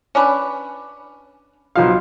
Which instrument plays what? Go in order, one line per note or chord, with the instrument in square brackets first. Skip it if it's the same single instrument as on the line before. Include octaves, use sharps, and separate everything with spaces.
[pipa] C#4 D4 B4
[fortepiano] B1 F3 F5